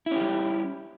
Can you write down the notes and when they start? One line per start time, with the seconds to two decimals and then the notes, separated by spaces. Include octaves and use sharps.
0.06 E4
0.11 C#4
0.16 G4
0.21 G3